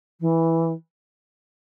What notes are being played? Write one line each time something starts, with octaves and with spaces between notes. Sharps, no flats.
E3